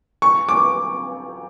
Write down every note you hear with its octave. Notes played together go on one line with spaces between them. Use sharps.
C#6
D6